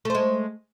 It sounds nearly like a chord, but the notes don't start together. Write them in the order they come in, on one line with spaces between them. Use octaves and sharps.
A3 C5 G#3